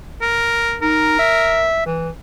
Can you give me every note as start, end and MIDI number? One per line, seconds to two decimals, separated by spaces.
0.21 0.77 70
0.81 1.14 63
0.81 1.70 70
1.19 1.83 76
1.86 2.09 52